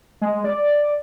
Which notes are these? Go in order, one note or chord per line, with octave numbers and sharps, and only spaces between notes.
G#3
D5